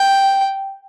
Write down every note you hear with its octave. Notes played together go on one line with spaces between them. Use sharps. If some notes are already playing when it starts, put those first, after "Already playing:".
Already playing: G5